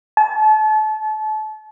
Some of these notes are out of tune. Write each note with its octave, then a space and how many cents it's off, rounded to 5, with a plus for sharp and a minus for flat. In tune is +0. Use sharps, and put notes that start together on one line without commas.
A5 -35